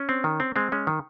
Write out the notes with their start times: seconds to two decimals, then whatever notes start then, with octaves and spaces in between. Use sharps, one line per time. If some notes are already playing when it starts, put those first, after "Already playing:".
Already playing: C#4
0.09 C4
0.24 D#3
0.40 C4
0.56 G#3 C4
0.72 G#3 C#4
0.87 D#3